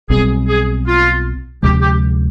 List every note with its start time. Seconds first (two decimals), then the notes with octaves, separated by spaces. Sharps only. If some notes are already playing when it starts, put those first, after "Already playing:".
0.10 B1 B2 G3 C4 G#4
0.48 G#4
0.86 F4
1.63 D2 C3 F3 G#3 G4
1.82 G4